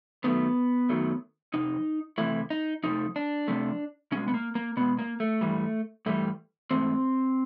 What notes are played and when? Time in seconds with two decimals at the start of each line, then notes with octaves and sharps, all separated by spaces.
0.24 F#2 D#3 F#3 A3 B3
0.89 F#2 D#3 F#3 A3
1.54 F2 C3 D#4
2.18 F2 C3 E3 A3 E4
2.50 D#4
2.83 F2 C3 F3 A3 D#4
3.16 D4
3.48 F2 C3 F3 A3
4.12 B2 G#3 C#4
4.28 B3
4.34 A#3
4.55 A#3
4.77 B2 G#3 B3
4.99 A#3
5.20 A3
5.41 G2 E3 G3
6.06 G2 E3 G3 A3
6.71 G#2 E3 A3 C4